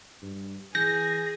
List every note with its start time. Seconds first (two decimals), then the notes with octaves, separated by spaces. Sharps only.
0.22 G2
0.75 E3 G#4 G6 A#6